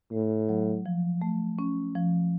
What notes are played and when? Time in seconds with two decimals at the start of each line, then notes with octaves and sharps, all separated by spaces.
0.12 A2 A3
0.49 F#3
0.86 F3
1.21 A3
1.59 C#4
1.95 F3